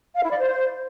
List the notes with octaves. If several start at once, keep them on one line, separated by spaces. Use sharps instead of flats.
F5
E4
D5
C5